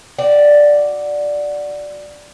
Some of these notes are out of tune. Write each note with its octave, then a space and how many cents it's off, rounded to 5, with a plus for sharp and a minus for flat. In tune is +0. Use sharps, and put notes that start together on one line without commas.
F#4 -5 D5 +0 G5 -30